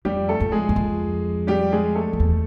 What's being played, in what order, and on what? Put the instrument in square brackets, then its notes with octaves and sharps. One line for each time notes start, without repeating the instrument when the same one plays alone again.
[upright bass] F2 [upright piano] G3 G4
[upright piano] A3 A4
[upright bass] F2
[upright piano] G#3 G#4
[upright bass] F#2
F2
[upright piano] G3 G4
G#3 G#4
A3 A4
[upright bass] F2
E2